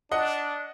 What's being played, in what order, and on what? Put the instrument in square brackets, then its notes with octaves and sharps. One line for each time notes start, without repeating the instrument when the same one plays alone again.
[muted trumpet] D4 [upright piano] D#5 F#5